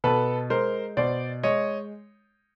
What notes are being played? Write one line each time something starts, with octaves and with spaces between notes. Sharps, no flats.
B2 A4 B4
G#3 A#4 C5
B2 C5 D5
G#3 C#5 D#5